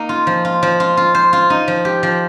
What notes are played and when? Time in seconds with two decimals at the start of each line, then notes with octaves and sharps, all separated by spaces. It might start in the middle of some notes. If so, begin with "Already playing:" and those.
Already playing: A#3 D#4 A#4
0.09 F4
0.27 F3
0.45 F4
0.63 F3
0.80 F4
0.97 F4
1.15 C5
1.33 F4
1.50 D#4
1.68 F3
1.85 G4
2.03 F3